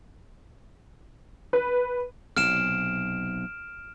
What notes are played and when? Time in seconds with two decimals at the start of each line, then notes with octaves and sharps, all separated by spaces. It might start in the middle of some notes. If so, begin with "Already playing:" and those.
1.53 B4
2.37 B1 C3 F6 D7 E7